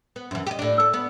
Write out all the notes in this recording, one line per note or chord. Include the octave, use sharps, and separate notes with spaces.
B3
F#2 E3
G4 D#5
A2 D4
A4
B3